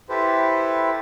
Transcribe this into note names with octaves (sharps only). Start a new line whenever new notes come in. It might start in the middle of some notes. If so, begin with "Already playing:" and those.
E4 G4 A4 B4 C5